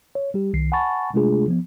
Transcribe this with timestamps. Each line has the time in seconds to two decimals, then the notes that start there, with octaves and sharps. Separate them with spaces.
0.15 C#5
0.34 G3 G4
0.54 C2 D#3 C7
0.72 F#5 G#5 A5 B5 C#6 A6
1.14 C3 G#3 A3 D4 F4 G#4
1.48 F3 B3